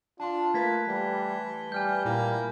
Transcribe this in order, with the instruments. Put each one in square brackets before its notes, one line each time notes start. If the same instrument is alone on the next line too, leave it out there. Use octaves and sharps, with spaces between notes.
[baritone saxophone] D4 [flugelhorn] F4 [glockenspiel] A5 C6
[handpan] A3 B4 [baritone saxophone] A#3 [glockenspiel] G#6 A6 B6
[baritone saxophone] E3 [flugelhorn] G3
[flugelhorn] G3 [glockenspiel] G#5 F6 G6
[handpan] A#2 E4 [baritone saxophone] A#3